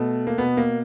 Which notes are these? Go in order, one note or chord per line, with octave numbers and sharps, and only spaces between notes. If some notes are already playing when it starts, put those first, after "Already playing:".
Already playing: B2 A3
A#3
B2 B3
A#3